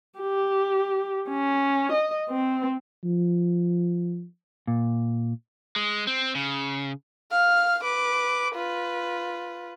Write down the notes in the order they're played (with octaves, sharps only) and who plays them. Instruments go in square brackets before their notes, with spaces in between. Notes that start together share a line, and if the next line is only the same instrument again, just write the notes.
[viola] G4
C#4
D#5
C4
[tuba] F3
[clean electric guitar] A#2
[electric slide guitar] G#3
C4
C#3
[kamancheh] F5 F6
B4 D6
F4 B4